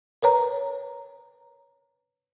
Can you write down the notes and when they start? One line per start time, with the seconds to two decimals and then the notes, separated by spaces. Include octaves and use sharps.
0.22 A#4 B4 C#5 A#5